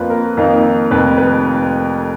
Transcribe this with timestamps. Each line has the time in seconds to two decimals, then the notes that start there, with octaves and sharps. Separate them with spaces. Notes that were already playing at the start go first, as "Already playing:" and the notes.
Already playing: F2 F3 A#3 B4
0.10 A#4
0.37 F2 D#3 A#3 D#4
0.91 F1 F2 D#3 B4
1.18 B4